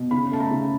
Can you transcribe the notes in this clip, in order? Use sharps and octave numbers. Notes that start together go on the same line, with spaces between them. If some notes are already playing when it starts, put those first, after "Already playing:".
Already playing: B2
C#3 B5
A3 A5
A#5
C#3